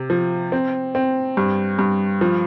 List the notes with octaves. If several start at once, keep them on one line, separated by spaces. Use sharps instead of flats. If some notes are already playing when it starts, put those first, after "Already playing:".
Already playing: C3
F3
C4
C4
G2
G2
F3